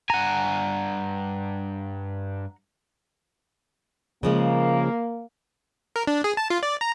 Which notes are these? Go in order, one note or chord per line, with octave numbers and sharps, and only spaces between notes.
G2 F#5 G#5 A#5
C#3 F3 G#3 A#3
A#4
D4
G#4
A5
F4
D5
A#5